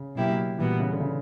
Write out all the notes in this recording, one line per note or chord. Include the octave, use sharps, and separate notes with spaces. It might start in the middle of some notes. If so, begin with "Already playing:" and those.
Already playing: C#3
B2 F#3 A#3 E4 G4
A#2 E3 G3 B3 F#4
C#3
D3
C#3